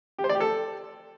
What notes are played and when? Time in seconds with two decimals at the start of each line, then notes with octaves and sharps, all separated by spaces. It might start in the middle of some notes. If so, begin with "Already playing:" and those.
0.18 G4
0.24 C5
0.29 D5
0.35 G4
0.40 A4